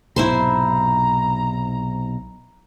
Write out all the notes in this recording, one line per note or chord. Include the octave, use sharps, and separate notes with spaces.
B1 G#2 C3 E4 C5 A#5 C6